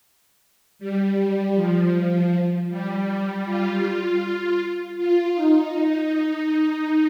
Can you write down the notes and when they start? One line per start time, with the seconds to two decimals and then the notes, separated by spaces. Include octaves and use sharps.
0.79 G3
1.55 F3
2.69 G3
3.46 F4
4.97 F4
5.35 D#4